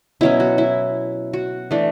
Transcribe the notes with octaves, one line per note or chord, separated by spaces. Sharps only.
B2 F#3 C#4 E4
F#4
E4
F#4
E3 A3 D4